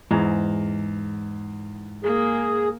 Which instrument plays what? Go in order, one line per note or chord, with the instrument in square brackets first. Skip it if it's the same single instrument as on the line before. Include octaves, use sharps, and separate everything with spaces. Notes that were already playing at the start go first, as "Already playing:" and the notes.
[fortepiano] E2 A#5 [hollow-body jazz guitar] G#2
[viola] A#3 [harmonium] G#4